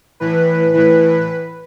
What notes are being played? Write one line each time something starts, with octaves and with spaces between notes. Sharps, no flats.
A2 E3 B4
A2 E3 B4